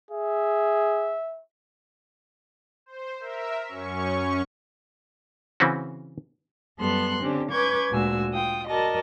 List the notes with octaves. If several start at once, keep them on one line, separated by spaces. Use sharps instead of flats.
G#4 E5
C5
A#4 E5
F#2 C#4 C#6
C#3 E3 C4 C#4 F#4
F#2 G3 B3 A4 C6 F#6
D3 C4 C#4 G4
C#4 B4 C#6 D6 G6 G#6
D2 A#2 G#3 F#4 G#5 E6
F4 G5 D#6
F#4 A#4 D5 D#5 A5